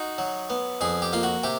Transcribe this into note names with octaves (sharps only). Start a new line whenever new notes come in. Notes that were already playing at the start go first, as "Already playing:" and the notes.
Already playing: D#4 F#4
F#3
B3
F2 G#4
G4
A#3 F4
F#4
C3 G4